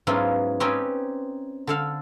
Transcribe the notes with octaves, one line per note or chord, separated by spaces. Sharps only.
G#2 F#3 B3 C#4 E4 F4
C4 C#4 D#4 G4 B4
D3 A4 F5